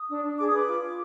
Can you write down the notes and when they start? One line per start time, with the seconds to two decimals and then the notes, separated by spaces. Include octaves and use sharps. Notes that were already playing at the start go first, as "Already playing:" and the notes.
Already playing: D#6
0.08 D4
0.23 D4
0.37 G#4 D6
0.48 D#6
0.53 B4 D6
0.67 F4
0.82 F4